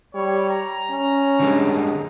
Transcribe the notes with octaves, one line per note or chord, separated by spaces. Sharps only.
G3 C#5
A#5
C#4
D3 G3 G#3